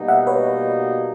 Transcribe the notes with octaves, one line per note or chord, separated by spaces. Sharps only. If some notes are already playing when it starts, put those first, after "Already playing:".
Already playing: B2 G3 A#3 D#4 F#4
E5 F#5
B4 C#5